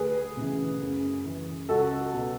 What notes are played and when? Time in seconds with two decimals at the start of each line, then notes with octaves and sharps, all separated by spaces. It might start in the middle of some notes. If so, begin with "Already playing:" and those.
Already playing: D2 G#4 B4
0.37 C#3 E3
0.81 F#2
1.26 E3
1.69 C#2 F#4 A4
2.13 B2